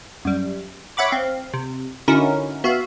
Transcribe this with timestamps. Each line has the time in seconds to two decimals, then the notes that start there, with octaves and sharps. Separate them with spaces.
0.25 F#2 G3
0.97 C#5 E5 F#5 B5 D6
1.11 C4 F5
1.54 C3
2.08 D3 C#4 D#4 E4 F#4 A#4
2.64 B3 F#4 E5 F5